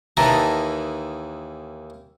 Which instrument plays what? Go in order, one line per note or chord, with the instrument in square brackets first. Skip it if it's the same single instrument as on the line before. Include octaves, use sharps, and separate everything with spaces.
[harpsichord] D#2 D#3 E3 [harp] A5 A#5